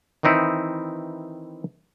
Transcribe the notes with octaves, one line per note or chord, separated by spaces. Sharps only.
D#3 E3 C4 D#4 E4